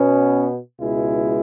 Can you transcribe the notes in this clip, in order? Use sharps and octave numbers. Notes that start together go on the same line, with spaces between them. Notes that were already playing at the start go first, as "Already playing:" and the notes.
Already playing: B2 B3 C#4
C#2 B2 G#3 E4